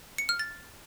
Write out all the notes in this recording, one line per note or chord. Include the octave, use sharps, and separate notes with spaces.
C#7
F6
A6